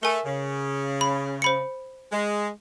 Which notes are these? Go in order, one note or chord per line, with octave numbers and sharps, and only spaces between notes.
A3 A#4 G#5
C#3
B5
C5 B5 C#7
G#3